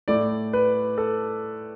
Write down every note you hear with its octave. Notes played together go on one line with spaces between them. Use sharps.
A2 A3 E4 D5
B4
A4